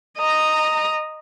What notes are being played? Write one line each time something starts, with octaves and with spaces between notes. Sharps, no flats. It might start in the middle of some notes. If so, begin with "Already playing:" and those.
D#5 A#5